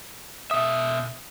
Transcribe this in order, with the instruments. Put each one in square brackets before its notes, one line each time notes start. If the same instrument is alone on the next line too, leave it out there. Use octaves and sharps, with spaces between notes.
[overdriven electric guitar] B2 E5 [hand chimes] D#6